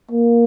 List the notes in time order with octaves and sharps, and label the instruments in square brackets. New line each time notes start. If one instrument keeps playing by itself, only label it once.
[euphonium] A#3